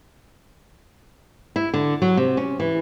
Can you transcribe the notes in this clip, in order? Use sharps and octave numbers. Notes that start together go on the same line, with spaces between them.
E4
D3
F#3
C3
C#4
E3